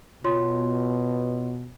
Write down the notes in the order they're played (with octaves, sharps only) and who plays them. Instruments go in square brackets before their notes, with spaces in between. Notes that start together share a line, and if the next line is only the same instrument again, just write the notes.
[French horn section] B2 [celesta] F4 C#5 C6